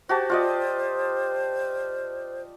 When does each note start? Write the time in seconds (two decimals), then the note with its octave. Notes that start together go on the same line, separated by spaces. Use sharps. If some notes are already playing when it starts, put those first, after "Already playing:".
0.09 F#4 G4 C5 A5
0.30 F4 D5 D#5